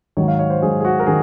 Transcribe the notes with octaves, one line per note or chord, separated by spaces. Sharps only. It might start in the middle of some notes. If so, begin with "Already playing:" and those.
G#2 D#3 F#3 C#5
F5
C#5
C5
G#2 D#3 F#3 G#4
G#4
F#4
A#4
D#3 G#4